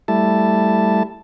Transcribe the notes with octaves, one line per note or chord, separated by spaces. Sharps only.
G3 A3 E4 A5